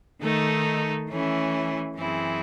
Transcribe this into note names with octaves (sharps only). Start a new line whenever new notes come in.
D#3 A3 D#4 A4
E3 A3 C#4 E4
F#2 E3 C4 E4 G#4